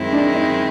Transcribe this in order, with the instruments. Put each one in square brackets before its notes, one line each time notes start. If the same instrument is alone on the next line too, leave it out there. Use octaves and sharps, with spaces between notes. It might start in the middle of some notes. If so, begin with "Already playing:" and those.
Already playing: [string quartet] F#2 D#3 G#3 C4 E4
[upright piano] D4
D#4